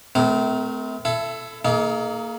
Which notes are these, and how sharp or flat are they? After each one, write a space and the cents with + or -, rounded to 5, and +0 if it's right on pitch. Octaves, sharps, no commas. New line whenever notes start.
A3 -25 C4 -40 A#4 +10
E4 +30 A4 +0
A#3 -10 D#4 +25 G#4 +40